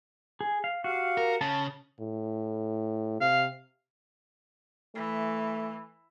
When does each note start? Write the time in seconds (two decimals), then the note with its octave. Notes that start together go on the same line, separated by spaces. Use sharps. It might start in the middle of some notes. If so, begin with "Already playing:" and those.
0.41 G#4
0.64 F5
0.84 F#4 G4 F5
1.18 A#4
1.41 C#3 A5
2.00 A2
3.21 C3 F5
4.95 E3 A3